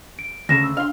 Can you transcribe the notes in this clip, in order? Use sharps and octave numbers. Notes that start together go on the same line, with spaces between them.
D7
D2 C#3 A#6 E7
E6
D4 F5 C6